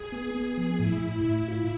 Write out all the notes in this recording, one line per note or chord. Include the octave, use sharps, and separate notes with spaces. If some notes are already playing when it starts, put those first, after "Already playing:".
Already playing: G#4
B3
B3
F3
A2 E4
A2
A2
F4